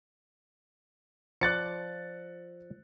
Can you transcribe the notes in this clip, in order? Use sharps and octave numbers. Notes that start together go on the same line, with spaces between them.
F3 D5 F#6 A6 C#7